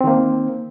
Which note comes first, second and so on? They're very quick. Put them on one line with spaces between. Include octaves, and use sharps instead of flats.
C4 D#3 A#3